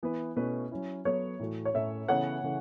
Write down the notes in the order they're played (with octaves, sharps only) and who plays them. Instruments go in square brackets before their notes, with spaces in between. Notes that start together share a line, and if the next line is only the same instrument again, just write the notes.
[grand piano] E3 B3 E4 B4
B2 A3 C#4 E4 B4
F#3 C#4 E4
[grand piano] F#3 B3 A4 [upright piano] C#5
[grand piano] A2 E3 A3 F#4
[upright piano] C#5
[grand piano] A2 A3 C#4 [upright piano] E5
[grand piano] C#3 E3 B3 E4 A4 [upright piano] C#5 F#5
[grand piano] C#3 E3 A3